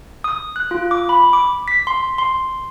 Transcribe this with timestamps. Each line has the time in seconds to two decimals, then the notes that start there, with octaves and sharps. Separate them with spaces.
0.24 D#6
0.56 F#6
0.71 F4
0.91 D6
1.09 B5
1.33 D6
1.68 B6
1.87 C6
2.18 C6